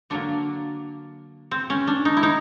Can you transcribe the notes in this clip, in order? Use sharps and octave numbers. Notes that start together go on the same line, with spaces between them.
D3 F#3 A#3 D4
C4
C#4
D4
D#4
E4
D#4